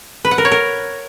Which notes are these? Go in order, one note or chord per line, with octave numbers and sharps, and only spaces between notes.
B4
F#5
A#4
C#5
A#4